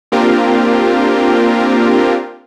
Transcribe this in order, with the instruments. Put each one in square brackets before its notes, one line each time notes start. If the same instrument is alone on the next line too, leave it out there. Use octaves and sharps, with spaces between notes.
[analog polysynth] A#3 C4 D4 F4 G4 A#4